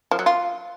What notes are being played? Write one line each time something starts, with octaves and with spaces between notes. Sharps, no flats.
F3
F#3
F4